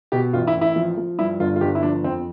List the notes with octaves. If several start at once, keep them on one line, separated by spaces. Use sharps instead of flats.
B2 G4
A1 F4
E4
A1
E4
F3
F3
G2 E4
G1 F4
F4
G1 G4
E4
F3 D4
F2 C4